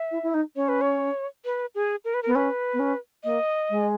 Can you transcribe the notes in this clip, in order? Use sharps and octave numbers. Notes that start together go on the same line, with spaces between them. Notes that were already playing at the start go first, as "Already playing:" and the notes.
Already playing: E5
E4
E4
D#4
C#4 C#5
B4
C#5
B4
G#4
A#4
B4
A#4
B3
C#4 B4
B3
C#4
A#3 D#5
G#3